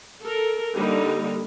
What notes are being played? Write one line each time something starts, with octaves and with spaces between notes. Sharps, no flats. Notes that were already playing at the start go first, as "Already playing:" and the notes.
A4 A#4
D3 G3 A#3 D#4